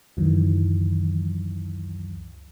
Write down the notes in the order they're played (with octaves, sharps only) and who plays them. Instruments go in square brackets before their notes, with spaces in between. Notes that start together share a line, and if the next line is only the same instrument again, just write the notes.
[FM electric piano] C#2 F#2 D#3 E3 F#3